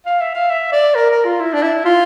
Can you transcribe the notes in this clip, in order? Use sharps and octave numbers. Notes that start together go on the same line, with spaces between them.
F5
E5
F5
E5
D5
A#4
A#4
F4
E4
D4
E4
F4